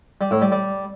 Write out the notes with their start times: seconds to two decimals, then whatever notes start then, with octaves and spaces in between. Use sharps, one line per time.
0.21 G3
0.31 A2
0.41 G3
0.52 G3